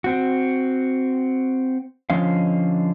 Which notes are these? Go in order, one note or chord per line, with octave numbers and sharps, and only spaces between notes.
C4 F#4
D3 F3 C#4 D#5 F5